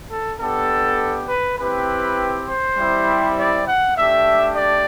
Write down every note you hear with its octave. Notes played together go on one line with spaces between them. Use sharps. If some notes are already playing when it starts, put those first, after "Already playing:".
A4
B3 D4 G4 A4
B4
C4 E4 G4 B4
C5
G3 C4 E4 G4
D5
F#5
A3 D4 G4 E5
D5